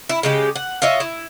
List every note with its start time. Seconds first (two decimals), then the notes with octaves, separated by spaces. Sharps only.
0.09 E4
0.23 C#3 G#3 G4
0.56 F#5
0.82 F4 C#5 D#5 E5
1.00 E4